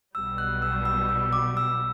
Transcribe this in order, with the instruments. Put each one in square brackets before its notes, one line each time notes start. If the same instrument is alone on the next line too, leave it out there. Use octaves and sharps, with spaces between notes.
[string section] B1 B2 G3 [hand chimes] E6
[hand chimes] F#6
E6
E6
E6
D6
E6